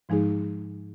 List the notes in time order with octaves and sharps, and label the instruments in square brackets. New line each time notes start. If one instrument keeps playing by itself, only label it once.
[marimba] G#2 F3 G#3 D#4 G#4